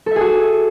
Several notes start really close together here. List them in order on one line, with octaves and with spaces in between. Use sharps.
A4 E5 G#4 F#4